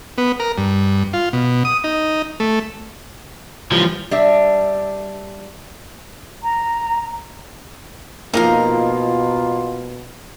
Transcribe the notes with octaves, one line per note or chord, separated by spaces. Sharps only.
B3
A#4
G2
F4
B2
D#6
D#4
A3
E3 F3 G3
G3 D4 E5
A#5
B2 F3 A#3 D#4 F4 A#4 F5